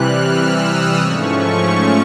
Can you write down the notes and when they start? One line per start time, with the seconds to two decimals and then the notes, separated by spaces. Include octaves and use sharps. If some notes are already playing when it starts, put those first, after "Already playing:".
Already playing: C3 E3 G3 F6 F#6
0.19 E6
0.59 D#6
0.98 G#2 F3 A3 C#4 C#6